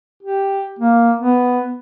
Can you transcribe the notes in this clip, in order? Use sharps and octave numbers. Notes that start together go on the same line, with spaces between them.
G4
A#3
B3